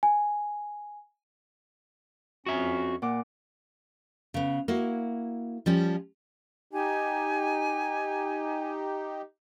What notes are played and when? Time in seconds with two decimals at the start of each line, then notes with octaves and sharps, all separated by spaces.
0.03 G#5
2.46 F2 C#4 F#4 E5
3.02 A#2 F#5 D6
4.34 C#3 B3
4.68 A#3 E4 F#4
5.66 F3 G3 C#4
6.73 D#4 G4 G#5